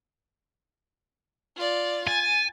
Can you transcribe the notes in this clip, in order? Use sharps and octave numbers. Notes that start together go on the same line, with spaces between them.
F4 D5
G#5 A6